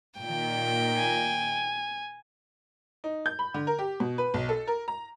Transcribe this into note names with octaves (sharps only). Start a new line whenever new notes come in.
A#2 D#3 G5
G#5
D#4
G6
B5
D3
A#4
G4
B2
B4
B1
A4
A#4
A#5